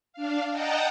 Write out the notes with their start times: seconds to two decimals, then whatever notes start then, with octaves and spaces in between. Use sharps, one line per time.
0.13 D4 F5
0.51 D#5 F#5 G5 A5 A#5